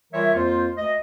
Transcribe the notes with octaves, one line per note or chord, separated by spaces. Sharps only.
E3 G3 F4 A#4 C#5 E5
F2 A#3 F4 C5
D2 D#5